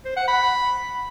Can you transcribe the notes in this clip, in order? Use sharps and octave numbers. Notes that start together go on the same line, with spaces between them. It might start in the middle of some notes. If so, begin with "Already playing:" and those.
C5
F#5
B5